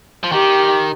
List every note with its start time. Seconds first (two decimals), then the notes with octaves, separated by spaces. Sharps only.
0.23 F3
0.32 D#3 G4